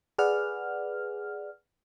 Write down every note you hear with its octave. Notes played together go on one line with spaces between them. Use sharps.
G#4 B4 D5 F#5 F6